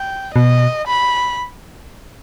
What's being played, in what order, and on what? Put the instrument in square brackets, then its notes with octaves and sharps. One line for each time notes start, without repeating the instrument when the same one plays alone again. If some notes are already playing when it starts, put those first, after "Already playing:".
Already playing: [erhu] G5
[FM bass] B2 [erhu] D#5
[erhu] B5